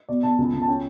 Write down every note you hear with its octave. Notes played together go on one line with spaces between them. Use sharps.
B2 D5
B2 A5
C#2
C#2
A5
C#4 G5